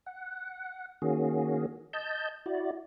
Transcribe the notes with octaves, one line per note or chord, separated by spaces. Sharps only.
F#5
D#3 A#3 C#4 F#4 G#4
D#5 A5 G6
E4 F#4 D5